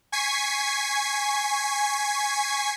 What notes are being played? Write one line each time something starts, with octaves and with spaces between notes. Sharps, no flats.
G#5 C#6 G#6 B6 C7